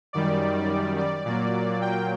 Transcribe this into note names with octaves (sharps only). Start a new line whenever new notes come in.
F#2 D#3 G3 D5
D5
A#2 F#3 A#3 D5
G5